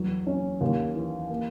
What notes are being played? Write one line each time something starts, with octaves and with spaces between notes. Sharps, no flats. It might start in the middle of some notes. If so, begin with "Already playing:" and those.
Already playing: E2 F#3
C#4
D#2
E3
A#3